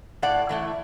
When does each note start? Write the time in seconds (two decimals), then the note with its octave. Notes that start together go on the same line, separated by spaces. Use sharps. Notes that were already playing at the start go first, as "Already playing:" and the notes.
0.22 A2 D5 F#5
0.49 E3 A3 E4